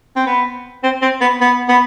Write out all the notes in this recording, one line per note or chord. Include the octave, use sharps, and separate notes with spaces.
C4
B3
C4
C4
B3
B3
B3